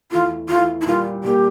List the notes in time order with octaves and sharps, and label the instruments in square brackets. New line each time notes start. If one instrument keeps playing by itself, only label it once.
[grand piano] E2 E3 A3 E4 [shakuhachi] F4
[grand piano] E2 E3 A3 E4 [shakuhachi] F4
[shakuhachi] E4
[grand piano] A#2 G3 A#3 [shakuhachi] F4
[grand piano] A#2 G3 A#3 [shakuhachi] G4